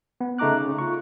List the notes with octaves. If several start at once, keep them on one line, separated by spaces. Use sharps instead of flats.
B3
C#3 A3 D#4 A#5 D6 F#6
C#3
F4 C#6